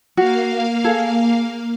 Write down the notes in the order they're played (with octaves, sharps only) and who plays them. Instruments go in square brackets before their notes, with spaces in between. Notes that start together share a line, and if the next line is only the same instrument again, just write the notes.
[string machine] A#3 F5 [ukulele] F#4
[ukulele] G#4 A4